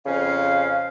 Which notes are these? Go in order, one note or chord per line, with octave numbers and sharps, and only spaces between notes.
F2 C#3 C#4 F5